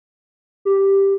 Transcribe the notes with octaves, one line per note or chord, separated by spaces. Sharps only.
G4